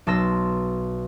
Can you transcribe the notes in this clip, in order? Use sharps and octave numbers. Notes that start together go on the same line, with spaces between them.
B1 A5 C6 E6 A#6 E7